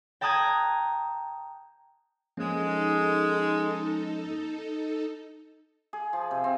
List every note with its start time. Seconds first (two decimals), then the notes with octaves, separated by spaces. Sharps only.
0.21 G5 A5 A#5 D#6 F#6 G#6
2.37 F3 G#3 A#3 C#4 D#4 A4
5.93 G#4
6.13 F3
6.31 C3
6.44 C4